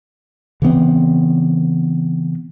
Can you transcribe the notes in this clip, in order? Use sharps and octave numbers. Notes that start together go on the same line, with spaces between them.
C#3 E3 B3 C4